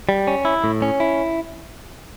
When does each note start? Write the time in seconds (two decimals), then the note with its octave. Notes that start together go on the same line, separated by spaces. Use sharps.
0.09 G3
0.27 C#4
0.45 E4
0.64 A2
0.82 C#4
1.00 E4